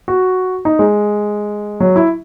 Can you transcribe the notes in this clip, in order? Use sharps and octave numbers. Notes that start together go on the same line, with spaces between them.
F#4
D#4
G#3
F#3
E4